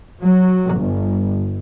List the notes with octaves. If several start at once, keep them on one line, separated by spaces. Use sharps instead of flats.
F#3
G1